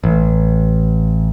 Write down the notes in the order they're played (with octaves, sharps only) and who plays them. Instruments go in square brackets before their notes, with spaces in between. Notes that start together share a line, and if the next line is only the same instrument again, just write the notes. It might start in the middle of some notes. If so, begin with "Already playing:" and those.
[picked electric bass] A1